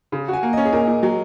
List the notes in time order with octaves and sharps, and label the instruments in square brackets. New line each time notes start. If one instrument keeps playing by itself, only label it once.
[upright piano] C#3
F#4
[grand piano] G#5
[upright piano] A#3
[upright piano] C#4 [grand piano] D#5
[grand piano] G#4
[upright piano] A#2 [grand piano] A#4
[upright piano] A#2
F#3